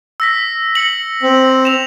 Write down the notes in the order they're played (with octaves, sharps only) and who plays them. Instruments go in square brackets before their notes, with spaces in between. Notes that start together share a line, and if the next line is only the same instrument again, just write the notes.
[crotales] E6 A#6 B6
A#6 C#7 F#7
[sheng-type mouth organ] C4
[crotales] E7 F7